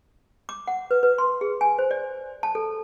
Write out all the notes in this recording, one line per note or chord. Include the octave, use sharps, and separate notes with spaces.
D6
F#5
B4
B4
C6
G#4
G#5
C5
D5
A5
A4